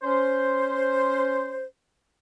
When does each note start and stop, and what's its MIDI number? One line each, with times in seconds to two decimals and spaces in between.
0.02 1.63 61
0.02 1.63 72